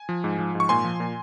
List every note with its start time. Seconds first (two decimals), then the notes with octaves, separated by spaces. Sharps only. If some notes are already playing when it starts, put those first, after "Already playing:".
Already playing: G#5
0.09 F3
0.24 G#2
0.39 F3
0.55 G#2
0.60 C#6
0.69 A#2 G#5 C6
0.84 F3
1.00 A#2